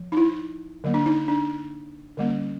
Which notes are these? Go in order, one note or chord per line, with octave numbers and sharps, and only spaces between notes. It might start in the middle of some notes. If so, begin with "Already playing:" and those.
Already playing: F3
D#4
E4
D3 F#3 A#3
D4
D#4
D4
D3 G3 A#3 C#4